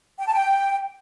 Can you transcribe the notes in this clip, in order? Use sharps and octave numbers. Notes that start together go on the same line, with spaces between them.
G5
A5
G5